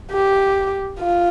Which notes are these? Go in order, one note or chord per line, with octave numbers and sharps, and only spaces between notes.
G4
F4